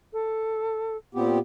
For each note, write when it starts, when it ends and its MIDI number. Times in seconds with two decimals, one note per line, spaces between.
0.13 0.96 69
1.15 1.39 46
1.15 1.39 59
1.15 1.37 60
1.15 1.39 67